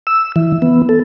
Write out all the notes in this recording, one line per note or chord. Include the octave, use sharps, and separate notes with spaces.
E6
E3
B3
A4